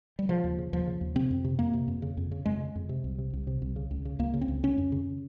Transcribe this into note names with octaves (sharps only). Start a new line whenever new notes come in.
G3
C#3 F3
D#2
C#3
D#2 F3
C#3
D#2
C3 C4
F2
C3
F2 A#3
C3
F2
C#3
F2
C#3
F2 G#3
C#3
F2
C3
C2
C3
C2
C3
C2
C#3
C#2
C#3
C#2 A#3
C#3
C4
C#2
C#3 C#4
F2
C#3